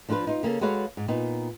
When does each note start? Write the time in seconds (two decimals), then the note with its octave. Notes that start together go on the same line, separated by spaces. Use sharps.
0.09 F3 D4 F4 A4 B4
0.27 D#4 F4
0.43 C#3 A#3 C#4 A4
0.61 G#3 F#4 A4 B4 C#5 F5
0.97 G#2
1.08 A#2 B3 D#4